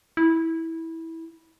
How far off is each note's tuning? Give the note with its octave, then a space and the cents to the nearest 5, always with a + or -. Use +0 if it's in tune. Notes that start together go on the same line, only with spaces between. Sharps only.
E4 -15